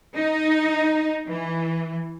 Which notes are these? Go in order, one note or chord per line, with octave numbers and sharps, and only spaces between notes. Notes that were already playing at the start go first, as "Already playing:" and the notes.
D#4
E3